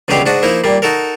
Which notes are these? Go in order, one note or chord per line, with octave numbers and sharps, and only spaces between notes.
C#2 B2 D3 F#3 G4 F5
G#2 D4 F#4 D#5
F3 A#3 D#4 E4
A#2 G3 A#3
D#4 F#4 A4 A#4